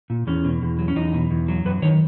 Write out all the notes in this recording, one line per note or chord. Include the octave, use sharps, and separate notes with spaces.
A#2
E2 C#4
B2
E2
F#3
C#4
E2 D#4
B2
E2
F#3
F#2 B4
D#3 C#5